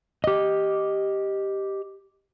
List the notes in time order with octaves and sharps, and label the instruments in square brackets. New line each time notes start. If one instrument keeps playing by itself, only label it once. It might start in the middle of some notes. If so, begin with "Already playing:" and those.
[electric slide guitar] G4 D#5